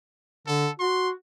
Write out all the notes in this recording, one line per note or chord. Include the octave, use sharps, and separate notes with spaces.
D3 A4
F#4 C6